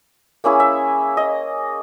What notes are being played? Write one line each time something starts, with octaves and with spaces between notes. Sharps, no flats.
A#3 C#4 E4 G#4
E5
D#5